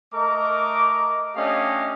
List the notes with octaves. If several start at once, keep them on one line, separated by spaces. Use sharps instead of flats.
A3 A#4 D#5 A#5 D6
A3 C#4 D4 G4 D#5 F5